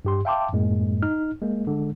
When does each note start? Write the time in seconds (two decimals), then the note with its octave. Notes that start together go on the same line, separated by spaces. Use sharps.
0.05 G2 G4 C6
0.25 E5 F5 G5 A5 C6 D6
0.53 F#2 A2 G#3 A#3
1.03 D#4 F6
1.42 G#3 A#3
1.67 D3 G#3